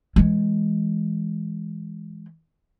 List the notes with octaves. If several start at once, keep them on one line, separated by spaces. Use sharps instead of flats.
E3 G#3